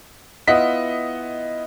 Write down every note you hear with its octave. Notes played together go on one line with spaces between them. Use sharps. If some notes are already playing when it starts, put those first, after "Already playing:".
B3 E4 F4 D#5 F#5 B6